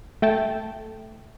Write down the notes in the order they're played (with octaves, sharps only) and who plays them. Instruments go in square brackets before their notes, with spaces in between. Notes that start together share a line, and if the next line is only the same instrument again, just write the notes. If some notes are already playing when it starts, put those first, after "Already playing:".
[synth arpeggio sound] A3 G5 A5